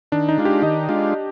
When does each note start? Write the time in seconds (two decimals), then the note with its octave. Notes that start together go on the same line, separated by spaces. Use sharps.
0.12 D#3 D4
0.29 D#4
0.38 G#3 D4 F4
0.45 G4
0.62 D#3 D#5
0.89 G#3 D4 F4